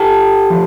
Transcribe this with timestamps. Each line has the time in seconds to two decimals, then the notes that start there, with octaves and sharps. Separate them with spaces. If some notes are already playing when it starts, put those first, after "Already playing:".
Already playing: G4 A4
0.50 F3